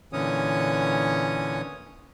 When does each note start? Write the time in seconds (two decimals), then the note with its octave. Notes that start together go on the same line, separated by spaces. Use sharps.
0.13 A#2 D3 E3 C#4 C#5 D#6